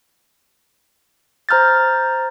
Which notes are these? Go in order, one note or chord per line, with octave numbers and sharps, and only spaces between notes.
C5 A#5 F6 G6 A6